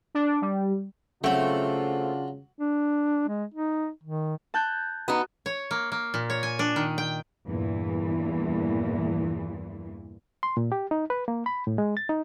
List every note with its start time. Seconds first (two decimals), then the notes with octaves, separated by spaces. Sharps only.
0.15 D4
0.42 G3
1.24 C#3 F#3 A3 C4 D4 F4
2.59 D4
3.28 G#3
3.54 D#4
4.03 D#3
4.54 A5 F#6 G6
5.08 B3 D#4 F#4
5.46 C#5
5.71 A#3
5.92 A#3
6.14 A#2
6.30 C#5
6.43 G#5
6.59 D4
6.76 D#3
6.98 G5
7.47 E2 G2 A#2 E3
10.43 C6
10.57 A#2
10.72 G4
10.91 D#4
11.10 B4
11.28 A#3
11.46 B5
11.67 A2
11.78 G#3
11.97 A6
12.09 D#4